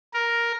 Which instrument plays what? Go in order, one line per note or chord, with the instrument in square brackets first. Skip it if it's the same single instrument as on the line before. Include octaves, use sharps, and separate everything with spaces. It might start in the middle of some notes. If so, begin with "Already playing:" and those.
[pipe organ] A#4